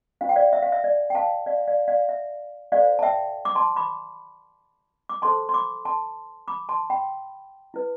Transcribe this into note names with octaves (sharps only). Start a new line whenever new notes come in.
D4 F4 C5 F5
G5
D5 F5
E5
F5
E5
D5
G5
F5 A5
D5 F5
E5
D5 F5
D5 F5
E5
F4 A4 C5 D5 F5
A5
E5 G5
D6
A5 C6
B5 D6
D6
D4 A4 C5 A5 C6
C6
B5 D6
A5 C6
B5 D6
A5 C6
G5 B5
E4 B4